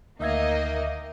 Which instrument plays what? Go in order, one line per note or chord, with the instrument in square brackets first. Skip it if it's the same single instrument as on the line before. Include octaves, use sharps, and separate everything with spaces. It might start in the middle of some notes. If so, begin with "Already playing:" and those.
[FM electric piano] D2 E5 G#6 [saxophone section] D#3 D#4 [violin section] A#3 D#5